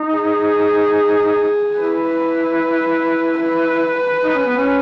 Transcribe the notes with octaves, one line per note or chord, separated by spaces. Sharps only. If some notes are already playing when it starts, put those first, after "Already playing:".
Already playing: D#4
G#4
E4 B4
B4
D#4
C#4
B3
C#4